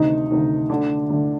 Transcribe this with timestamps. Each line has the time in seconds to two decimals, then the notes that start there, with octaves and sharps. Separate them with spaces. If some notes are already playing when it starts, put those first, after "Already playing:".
Already playing: D2 C3 D#3 D#4
0.31 D2 C3 D#3
0.69 D2 D3 D4
1.10 D2 D3